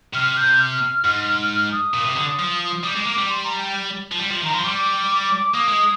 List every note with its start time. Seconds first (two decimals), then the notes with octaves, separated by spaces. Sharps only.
0.14 C3 F6
0.37 G6
0.59 F6
1.04 G#2
1.49 F6
1.72 D#6
1.94 A#2
2.05 C3
2.17 D3
2.39 F3
2.84 G3 D6
2.96 G#3
3.07 A#3 D6
3.18 G3
3.29 C6
3.44 A#5
3.59 G5
4.12 F3
4.19 G3
4.31 F3
4.42 D#3
4.45 A#5
4.53 F3 C6
4.64 G3 D6
5.54 A#3 D#6
5.68 G#3